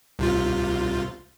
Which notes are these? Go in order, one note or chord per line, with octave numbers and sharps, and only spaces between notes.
C2 C3 F4